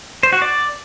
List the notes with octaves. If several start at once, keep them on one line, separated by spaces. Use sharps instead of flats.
C5
F#4
D5